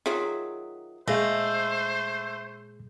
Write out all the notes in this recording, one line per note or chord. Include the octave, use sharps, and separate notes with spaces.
D#3 F#3 F4 G#4 E5
A#2 G#3 A3 G#4 C5 D#5 F5